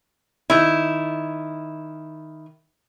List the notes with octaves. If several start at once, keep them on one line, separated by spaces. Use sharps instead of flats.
D#3 E4